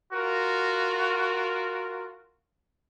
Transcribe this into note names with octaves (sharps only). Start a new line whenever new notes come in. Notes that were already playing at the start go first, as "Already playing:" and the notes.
F4 F#4 A#4